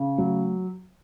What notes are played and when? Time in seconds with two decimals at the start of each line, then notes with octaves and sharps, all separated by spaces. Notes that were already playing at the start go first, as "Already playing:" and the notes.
Already playing: C#3
0.18 F#3 A3